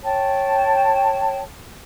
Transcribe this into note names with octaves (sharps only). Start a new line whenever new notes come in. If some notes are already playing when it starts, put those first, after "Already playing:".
C#5 G5 A5